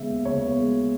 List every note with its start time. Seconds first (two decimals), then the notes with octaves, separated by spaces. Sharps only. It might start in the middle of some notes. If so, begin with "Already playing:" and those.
Already playing: C#3 G#3 B3 E5
0.09 D#2
0.25 C#3 C#5
0.42 B3
0.58 G#3